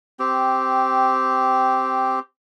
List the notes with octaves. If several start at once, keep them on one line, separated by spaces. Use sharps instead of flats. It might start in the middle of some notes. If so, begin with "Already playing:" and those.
C4 G4